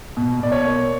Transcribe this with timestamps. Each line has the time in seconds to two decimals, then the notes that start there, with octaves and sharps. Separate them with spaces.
0.17 B2
0.40 B2 D5
0.52 C#5
0.65 A#3